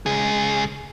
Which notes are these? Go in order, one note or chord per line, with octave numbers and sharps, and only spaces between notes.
C#2 G#4